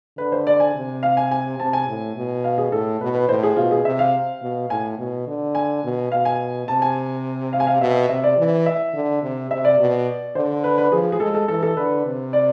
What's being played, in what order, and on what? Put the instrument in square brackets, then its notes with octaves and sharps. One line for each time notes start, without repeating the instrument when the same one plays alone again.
[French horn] D3 [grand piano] B4
[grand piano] C5
D5
G#5
[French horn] C3
[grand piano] F5
G#5
G#5
[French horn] C3 [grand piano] A5
[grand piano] G#5
[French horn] A2
B2
[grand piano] F5
G#4
[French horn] A2 [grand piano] A4
[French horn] B2 [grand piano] B4
[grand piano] B4
[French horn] A2 [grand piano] C5
[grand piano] G#4
[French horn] B2 [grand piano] F4
[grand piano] G#4
[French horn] C3 [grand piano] E5
[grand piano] F5
[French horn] B2
[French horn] A2 [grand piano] G#5
[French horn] B2
D3
[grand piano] G#5
[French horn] B2
[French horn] B2 [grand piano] F5
[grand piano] G#5
[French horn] C3 [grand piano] A5
[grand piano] G#5
F5
G#5
F5
[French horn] B2 [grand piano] E5
[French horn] C3 [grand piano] E5
[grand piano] D5
[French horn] E3
[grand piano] E5
[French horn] D3
C3
[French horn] C3 [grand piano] E5
[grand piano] D5
[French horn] B2
[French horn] D3 [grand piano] C5
[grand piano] B4
B4
[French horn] F3 [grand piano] G#4
[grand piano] G#4
[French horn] G#3 [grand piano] A4
[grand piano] A4
[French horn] E3 [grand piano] A4
[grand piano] A4
[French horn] D3 [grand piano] B4
[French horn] C3
[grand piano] D5